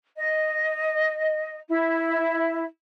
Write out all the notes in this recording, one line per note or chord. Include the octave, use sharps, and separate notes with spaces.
D#5
E4